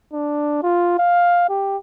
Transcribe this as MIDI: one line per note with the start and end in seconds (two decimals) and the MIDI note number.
0.13 0.63 62
0.63 0.95 65
0.99 1.46 77
1.49 1.77 67